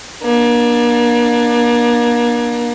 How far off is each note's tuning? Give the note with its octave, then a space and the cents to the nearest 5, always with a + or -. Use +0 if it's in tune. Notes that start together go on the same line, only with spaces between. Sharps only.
A#3 +35 D4 +20